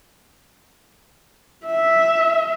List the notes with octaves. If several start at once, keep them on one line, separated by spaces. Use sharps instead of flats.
E5